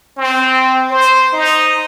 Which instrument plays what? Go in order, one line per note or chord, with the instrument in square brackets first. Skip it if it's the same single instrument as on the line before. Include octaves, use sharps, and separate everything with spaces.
[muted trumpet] C4
C5
D#4